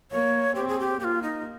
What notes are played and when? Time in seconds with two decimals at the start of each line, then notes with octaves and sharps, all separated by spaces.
0.11 A#3 C#5
0.55 C4 G4
0.68 G#4
0.80 G4
1.00 A#3 G4
1.04 F4
1.23 D#4